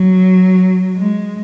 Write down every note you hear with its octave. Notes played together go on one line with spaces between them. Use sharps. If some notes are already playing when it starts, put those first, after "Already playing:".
Already playing: F#3
G#3